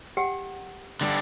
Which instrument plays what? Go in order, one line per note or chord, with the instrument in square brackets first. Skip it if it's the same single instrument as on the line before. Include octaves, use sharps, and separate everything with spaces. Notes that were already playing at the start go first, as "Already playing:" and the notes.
[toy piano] G4 F#5 G5
[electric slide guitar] D3 G3 D4